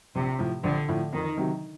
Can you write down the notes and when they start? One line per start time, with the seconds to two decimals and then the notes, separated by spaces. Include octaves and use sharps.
0.15 A#1 C3
0.39 A2 F3
0.64 A#1 D3
0.88 A2 F3
1.13 F2 D#3
1.37 C3 D#3 F#3